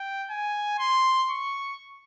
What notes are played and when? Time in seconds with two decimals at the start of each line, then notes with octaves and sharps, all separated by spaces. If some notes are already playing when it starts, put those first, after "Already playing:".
Already playing: G5
0.30 G#5
0.79 C6
1.30 C#6